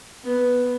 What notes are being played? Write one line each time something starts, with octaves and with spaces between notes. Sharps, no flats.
B3